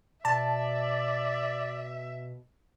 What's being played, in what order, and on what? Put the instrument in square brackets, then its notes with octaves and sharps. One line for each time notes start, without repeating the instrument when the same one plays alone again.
[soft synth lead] B2 [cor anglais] D5 [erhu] E5 [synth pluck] A5